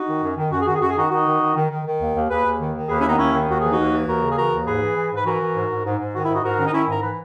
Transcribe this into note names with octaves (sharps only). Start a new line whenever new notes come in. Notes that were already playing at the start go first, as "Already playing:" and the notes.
Already playing: D#4 F#4
D#3
F#2
D#3
F#2 F#4
G#4
D#3 F#4
G#4
F#2 F#4
G#4
D#3 D#4 F#4
D#3 D#4 F#4
D#3
D#3
D#3
D#3
D#3
D#2
D#2
D#2 G#4 B4
D#2
D#3
D#3
D#2 G#4 B4
C#4 E4
D#3 B3 D#4
D#2 C#4 E4
D#3
D#2 F#4
E3 G#4
D#4 F#4
D#2
E3
D#2 F#4 A#4
C#3
G#4
E3 F#4 A#4
D#2
G#2 G#4 B4
E3
E3
G#2 B4
E3 F#4 A#4
E3
G#2
G#2
G#2
G#2
D#3 F#4
E4
G#2 D#4 F#4
G#2 F#4 A#4
D#3 C#4
D#4
D#3 C#4 E4
G#2 A#4
E3 B4